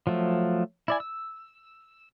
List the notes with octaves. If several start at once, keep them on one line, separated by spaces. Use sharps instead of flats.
F3 F#3 A3
E4 D5 G#5
E6